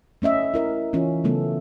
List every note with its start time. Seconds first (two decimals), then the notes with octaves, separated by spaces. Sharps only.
0.22 A3 C#4 D#5 E5
0.54 E4 A#4 E5
0.93 E3 C#4 F4
1.24 C#3 F#3 A3 B3 A4